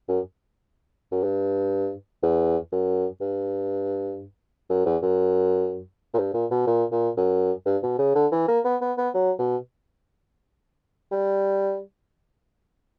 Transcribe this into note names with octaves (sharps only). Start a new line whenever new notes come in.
F#2
F#2
G2
E2
F#2
G2
F#2
E2
F#2
A#2
G2
A#2
B2
A#2
A#2
F#2
G2
B2
C#3
D3
E3
A#3
B3
B3
B3
F#3
B2
G3